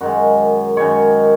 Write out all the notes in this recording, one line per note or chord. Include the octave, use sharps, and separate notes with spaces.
F#2 D#3 G#3 F#4
F#2 D#3 G#3 C#5